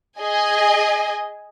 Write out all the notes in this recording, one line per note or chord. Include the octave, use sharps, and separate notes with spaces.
G#4 D#5 G#5